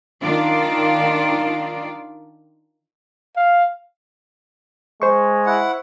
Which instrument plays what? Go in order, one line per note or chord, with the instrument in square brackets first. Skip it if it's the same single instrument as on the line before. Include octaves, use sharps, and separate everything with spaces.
[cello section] D#3 D4 F4 D5
[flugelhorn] F5
[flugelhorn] G#3 [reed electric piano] C5 C#6
[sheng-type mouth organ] E4 F#5